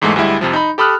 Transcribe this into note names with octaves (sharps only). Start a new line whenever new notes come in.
E2 G#2 E3 G#3 A3
D2 G3 G#3 E4 E5
F2 C3 F3
D#4 B5
G4 A4 B5 D#6 F6 F#6